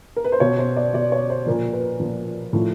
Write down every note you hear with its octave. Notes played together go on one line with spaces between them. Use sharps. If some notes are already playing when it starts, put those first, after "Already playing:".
A#4
B4
C5
B2 C#5
C5
D5
B2 D5
C#5
C5
A#2 F3 A#4
B4
A#2 F3
A2 F3